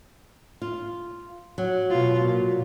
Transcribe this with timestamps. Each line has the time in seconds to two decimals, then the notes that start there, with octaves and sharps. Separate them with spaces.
0.62 F4
1.58 F#3
1.90 B2 F4
2.23 A#2